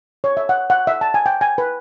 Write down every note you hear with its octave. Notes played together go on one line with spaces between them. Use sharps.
C#5
E5
F#5
F#5
E5
A5
G#5
G5
G#5
B4